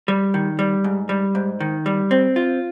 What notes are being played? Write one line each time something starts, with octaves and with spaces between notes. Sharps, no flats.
G3
D#3
G3
G#2
G3
G#2
D#3
G3
C4
F4